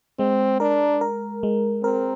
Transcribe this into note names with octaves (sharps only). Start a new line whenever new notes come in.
G#3 C4
D4 A#4
A#4
G#3
C4 A#4